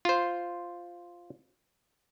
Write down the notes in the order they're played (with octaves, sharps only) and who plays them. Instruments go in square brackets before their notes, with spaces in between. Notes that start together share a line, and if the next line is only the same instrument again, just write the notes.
[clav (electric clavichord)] F4 C5